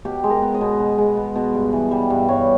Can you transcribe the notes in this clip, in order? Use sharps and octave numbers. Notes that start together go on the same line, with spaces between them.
B2 G4
G#3
A#4
B3
D#5
B2
B2
G#3
B3
B2
G2
E3
G3
G2
G2 C#5